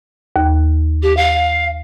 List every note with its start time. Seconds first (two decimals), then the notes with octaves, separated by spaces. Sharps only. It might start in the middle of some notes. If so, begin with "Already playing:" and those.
0.36 D#2
1.02 G4
1.16 F5